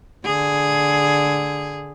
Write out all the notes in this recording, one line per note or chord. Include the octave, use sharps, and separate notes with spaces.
D3 G#4